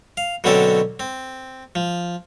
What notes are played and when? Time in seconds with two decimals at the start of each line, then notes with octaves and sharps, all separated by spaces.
0.17 F5
0.44 B2 D3 F#3 C4 C#4 A4
1.00 C4
1.75 F3